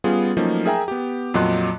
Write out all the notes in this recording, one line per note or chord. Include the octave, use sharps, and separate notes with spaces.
G3 B3 C#4 F4 G#4
F3 F#3 A3 A#3 C#4 D#4
G#4 A#4 E5 G5 G#5 A#5
B3 G4
F2 A#2 F#3 D#5 C6 F#6